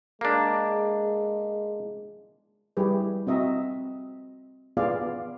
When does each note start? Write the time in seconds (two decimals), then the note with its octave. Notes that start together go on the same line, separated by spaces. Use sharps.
0.21 G#3 A#3 D4
2.77 G3 E4 G4 G#4 B4
3.27 C4 F#4 D#5 E5 A#5
4.77 B3 F4 G#4 D5 F5